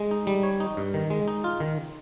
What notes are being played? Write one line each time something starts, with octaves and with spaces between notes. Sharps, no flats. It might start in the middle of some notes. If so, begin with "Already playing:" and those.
Already playing: G#3
D#4
G3
C#5
D#4
G2
D#3
G#3
D#4
F4
D#3